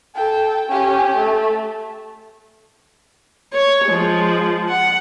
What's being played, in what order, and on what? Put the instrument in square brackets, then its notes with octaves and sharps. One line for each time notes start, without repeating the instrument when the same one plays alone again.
[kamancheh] A4 G5
C#4 G4
A3
[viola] C#5
F3 G#3
F#5